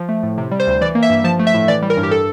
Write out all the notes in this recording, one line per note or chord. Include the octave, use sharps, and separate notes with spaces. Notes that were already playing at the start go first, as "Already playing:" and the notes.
Already playing: F3
A3
A2
C3
G3
C5
D2
E3 D5
A#3
E5
G2
F3 A5
A3
E5
A2
E3 D5
G3
A#4
G2
G4
A4